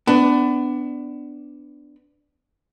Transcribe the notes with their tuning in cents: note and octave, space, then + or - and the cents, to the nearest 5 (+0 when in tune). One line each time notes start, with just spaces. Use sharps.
B3 +25 D4 +0